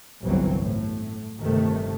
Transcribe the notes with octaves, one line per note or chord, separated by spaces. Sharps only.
G1 C2 E3 F#3 C4
A2
G1 C3 D#3 A3